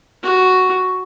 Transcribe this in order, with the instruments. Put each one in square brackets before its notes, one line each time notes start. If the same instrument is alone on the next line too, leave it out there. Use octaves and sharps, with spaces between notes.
[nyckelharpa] F#4